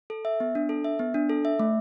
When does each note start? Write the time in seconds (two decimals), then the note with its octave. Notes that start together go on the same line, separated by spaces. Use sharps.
0.10 A4
0.25 E5
0.40 B3
0.55 D4
0.69 A4
0.84 E5
0.99 B3
1.14 D4
1.30 A4
1.45 E5
1.59 A3